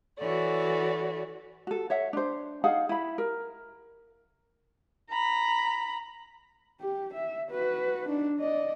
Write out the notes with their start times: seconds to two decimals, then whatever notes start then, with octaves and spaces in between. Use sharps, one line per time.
0.18 E3 F#4 A4 C#5 D5
1.67 F#4 A4
1.90 C#5 E5 F#5
2.13 D4 C5
2.64 D#4 G#4 F5 F#5
2.89 E4 B5
3.18 A#4
5.10 A#5 B5
6.81 G4
7.14 E5
7.51 F#4 B4
8.08 D4 D#4
8.39 D5 D#5